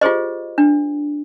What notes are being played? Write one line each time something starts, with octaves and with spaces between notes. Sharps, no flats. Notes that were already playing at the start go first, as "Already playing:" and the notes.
F4 G4 G#4 C5 D#5
D4